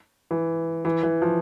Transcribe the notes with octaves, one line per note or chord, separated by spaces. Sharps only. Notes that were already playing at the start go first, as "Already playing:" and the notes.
E3
E3
E3
F3